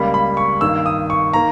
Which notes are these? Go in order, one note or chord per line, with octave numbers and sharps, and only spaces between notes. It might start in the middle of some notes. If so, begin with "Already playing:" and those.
Already playing: C#2 C#3 G3 A#3 B5
B5
C#6
G2 D#3 A#3 E6
D#6
C#6
D#3 A#3 A#5